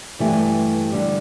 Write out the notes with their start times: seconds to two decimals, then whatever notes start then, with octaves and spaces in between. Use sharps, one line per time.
0.19 G2 E3 A3 E4 G4
0.92 D3 G3